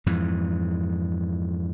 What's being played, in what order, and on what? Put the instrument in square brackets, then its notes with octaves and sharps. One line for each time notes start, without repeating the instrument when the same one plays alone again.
[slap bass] F2 G#2 E3